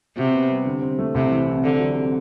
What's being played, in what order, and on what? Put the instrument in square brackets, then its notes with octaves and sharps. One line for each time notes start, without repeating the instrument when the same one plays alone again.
[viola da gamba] C3 [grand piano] F#4
[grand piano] B3
G3
D3
C4
A3
[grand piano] C2 [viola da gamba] C3
[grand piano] E3
C3
[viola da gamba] D3 [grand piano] C4
[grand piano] F#3
C3